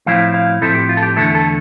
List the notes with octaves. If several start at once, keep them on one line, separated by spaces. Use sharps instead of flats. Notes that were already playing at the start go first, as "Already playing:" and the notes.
A2 F3 C4 E4 F5
F5
A2 F3 C4 E4 A4
G4
F4
A4
G4
E2 D3 A3 E4 A4
A4